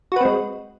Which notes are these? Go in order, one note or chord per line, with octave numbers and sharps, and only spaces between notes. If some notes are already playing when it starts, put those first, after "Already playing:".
G#3 C4 F#4 B4